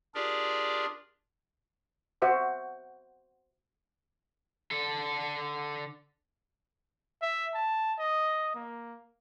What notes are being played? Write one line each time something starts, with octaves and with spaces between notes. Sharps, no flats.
D4 F4 G4 G#4 A#4 D5
F#4 C5 E5 F#5 D6
D3 A4
E5
A5
D#5
A#3